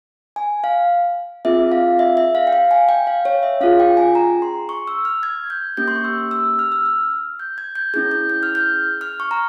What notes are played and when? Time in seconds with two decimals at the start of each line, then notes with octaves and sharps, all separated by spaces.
0.36 G#5
0.64 F5
1.45 C4 F4 G#4 E5
1.72 F5
1.99 E5
2.17 E5
2.35 F5
2.47 G5
2.53 F5
2.71 G#5
2.89 G5
3.07 F5
3.25 C#5
3.43 E5
3.61 C#4 F4 G#4 F5
3.80 G5
3.97 G#5
4.15 A#5
4.42 C6
4.69 C#6
4.88 E6
5.05 F6
5.23 G#6
5.50 G6
5.77 A#3 C#4 G4 G6
5.88 C6
5.95 C#6
6.04 E6
6.31 E6
6.59 F6
6.72 E6
6.86 F6
7.39 G6
7.58 G#6
7.75 G6
7.94 C#4 E4 G#4 G6
8.11 G6
8.30 G6
8.43 F6
8.55 G6
9.01 F6
9.20 C#6
9.31 A#5